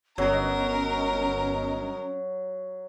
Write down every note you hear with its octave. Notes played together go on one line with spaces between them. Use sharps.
G1 F#3 B3 C#4 A#4 D#5